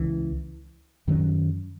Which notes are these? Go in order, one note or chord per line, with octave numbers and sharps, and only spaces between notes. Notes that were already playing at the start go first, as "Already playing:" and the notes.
Already playing: C#2 C#3 E3
F#2 D#3 F#3 C#4